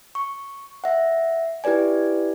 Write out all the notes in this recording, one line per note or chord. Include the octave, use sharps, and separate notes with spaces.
C#6
E5 F#5
E4 G4 B4 D5 G#5